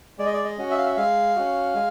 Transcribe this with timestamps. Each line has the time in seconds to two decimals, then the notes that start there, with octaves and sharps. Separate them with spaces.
0.19 G#3 D5
0.26 D#5
0.33 D5
0.44 D#5
0.58 C#4 F#4
0.71 E5
0.78 F5
0.86 E5
0.97 G#3 F5
1.36 C#4 F#4
1.75 G#3